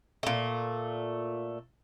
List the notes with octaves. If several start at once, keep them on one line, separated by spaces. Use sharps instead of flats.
A#2 A3